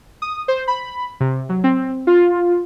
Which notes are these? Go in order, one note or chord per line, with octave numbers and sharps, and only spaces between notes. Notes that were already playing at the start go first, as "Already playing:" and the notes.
D#6
C5
B5
C3
F#3
C4
F4